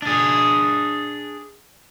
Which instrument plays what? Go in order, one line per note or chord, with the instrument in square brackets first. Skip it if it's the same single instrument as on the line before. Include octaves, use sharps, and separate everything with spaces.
[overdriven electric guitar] D4 G#4